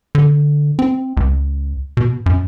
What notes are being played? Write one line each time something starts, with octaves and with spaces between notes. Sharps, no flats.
D3
C4
C#2
B2
F#2